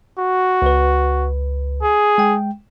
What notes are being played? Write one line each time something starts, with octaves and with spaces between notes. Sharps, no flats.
F#4
C#2 B4
G#4
G#3 G5